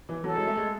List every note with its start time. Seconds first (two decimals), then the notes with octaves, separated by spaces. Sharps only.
0.09 E3
0.23 F#3 A4
0.36 G#3
0.47 A3
0.57 G#3